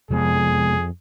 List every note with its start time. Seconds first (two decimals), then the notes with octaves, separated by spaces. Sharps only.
0.11 F2 C3 G#3 B3 G#4